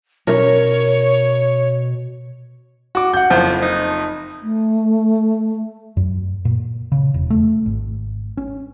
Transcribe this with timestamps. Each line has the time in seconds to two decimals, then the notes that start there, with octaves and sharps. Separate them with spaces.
0.27 B2 C#4 D4 A#4 C#5
2.95 F#4 D6
3.13 F#5 G6
3.30 F#1 F2 F3 G6
3.62 D#4
4.43 A3
5.97 F#2
6.45 A#2
6.92 C#3
7.14 E1
7.30 A3
7.66 G#1
8.37 C#4